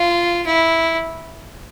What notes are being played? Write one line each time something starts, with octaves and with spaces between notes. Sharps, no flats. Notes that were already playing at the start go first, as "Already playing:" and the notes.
Already playing: F4
E4